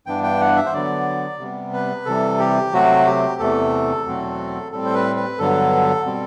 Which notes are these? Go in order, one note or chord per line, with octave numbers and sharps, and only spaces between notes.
G2 E3 B3 D4 G5
G5
F#5
E5
C5
D3 F#3 B3 D5
C3 G3 B3
B4
C3 E3 G3 A4
G4
C3 F#3 A3 C4 F#4
G4
E2 C3 E3 A3 A4
E2 B2 F#3 A3 C4
A2 G3 C4 A4
C5
B4
B4
G2 D3 F#3 B3 A4
B2 G3 C4